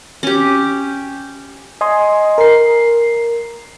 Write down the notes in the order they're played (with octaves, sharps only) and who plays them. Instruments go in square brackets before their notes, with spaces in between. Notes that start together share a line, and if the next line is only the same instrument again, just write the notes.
[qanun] C#4 G4
[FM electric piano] D#5 G#5 C6
A#4 C7